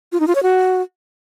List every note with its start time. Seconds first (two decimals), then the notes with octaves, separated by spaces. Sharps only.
0.12 F4
0.20 D#4
0.28 F4
0.35 C#5
0.43 F#4